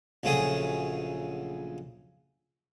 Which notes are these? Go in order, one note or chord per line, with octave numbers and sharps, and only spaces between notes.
A#1 C#3 F#3 A3 G#4 D#6